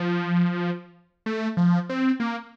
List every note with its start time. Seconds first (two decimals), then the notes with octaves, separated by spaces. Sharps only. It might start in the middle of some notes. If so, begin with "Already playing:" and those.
Already playing: F3
1.26 A3
1.57 F3
1.89 C4
2.20 A#3